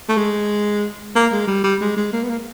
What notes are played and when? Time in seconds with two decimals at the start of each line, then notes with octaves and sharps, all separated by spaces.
0.09 A3
0.17 G#3
1.15 A#3
1.32 G#3
1.47 G3
1.64 G3
1.81 G#3
1.96 G#3
2.13 A#3
2.23 B3
2.29 A#3